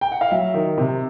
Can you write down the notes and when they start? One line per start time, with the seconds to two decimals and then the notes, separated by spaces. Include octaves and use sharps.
0.01 G5
0.12 F#5
0.21 F5
0.31 F#3 E5
0.54 D#3
0.78 C3